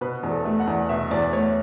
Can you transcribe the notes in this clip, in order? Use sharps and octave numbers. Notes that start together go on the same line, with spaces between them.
B2 B4
E2
A4
A3
F#5
E2
B2 E5
E2 D5
A3 C#5